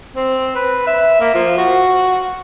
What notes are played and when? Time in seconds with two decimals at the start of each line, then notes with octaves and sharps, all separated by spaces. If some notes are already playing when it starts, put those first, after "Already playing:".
0.16 C4
0.55 B4
0.87 E5
1.20 A#3
1.34 F3
1.58 F#4